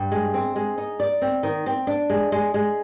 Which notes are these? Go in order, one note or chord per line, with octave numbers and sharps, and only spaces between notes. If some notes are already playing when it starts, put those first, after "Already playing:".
Already playing: G2
G#3
C4
G#3
D#4
D5
C4
D#3
C4
D4
G#3
G#3
G#3